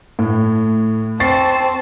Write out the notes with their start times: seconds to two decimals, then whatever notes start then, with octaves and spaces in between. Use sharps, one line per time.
0.19 A2
1.20 C4 A5 C#6 A6 C7